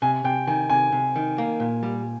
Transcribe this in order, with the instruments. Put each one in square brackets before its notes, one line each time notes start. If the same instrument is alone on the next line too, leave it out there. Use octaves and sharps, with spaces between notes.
[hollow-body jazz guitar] C3 [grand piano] G#5
[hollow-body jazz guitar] C3 [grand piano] G5
[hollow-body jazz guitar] D#3 [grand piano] G#5
[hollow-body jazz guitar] C3 [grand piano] G#5
[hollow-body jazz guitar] C3
D#3
A#3
A#2
G3